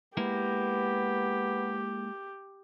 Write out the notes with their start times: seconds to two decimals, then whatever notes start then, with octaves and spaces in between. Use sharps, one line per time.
0.17 G#3 A#3 B3 E4 G4